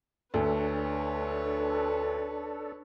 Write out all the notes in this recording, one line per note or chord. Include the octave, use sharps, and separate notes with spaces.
D2 D4 A4 B4 C#5